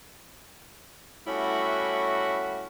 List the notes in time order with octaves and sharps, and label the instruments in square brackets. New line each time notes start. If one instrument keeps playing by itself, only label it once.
[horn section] G3 A3 C#4 E4 F#4